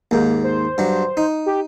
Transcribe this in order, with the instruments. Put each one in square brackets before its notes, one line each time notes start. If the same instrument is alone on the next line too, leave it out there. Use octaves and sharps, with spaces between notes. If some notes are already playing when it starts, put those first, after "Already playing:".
[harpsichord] D#2 G#2 [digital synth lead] A#3
[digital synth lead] C5
[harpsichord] G2 F#3
D#4
[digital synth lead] G4